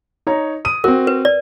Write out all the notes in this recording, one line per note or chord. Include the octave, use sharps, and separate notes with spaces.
D#4 C#5 A#5
D#6 D#7
C4 F#4 A#4
B4
D5